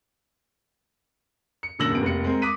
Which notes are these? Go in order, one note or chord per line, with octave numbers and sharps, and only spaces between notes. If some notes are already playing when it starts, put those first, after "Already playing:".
C#7
F#2 A#2 D3 E6 A#6 F#7
D1 F#2 B2 B3 D7
F1 A#3 C#7
G#3 C4 A#4
D6 D#6 F#6 B6 D#7